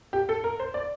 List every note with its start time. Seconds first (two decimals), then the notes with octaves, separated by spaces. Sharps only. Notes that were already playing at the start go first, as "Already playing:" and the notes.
0.13 G4
0.29 A4
0.44 A#4
0.60 C5
0.74 D5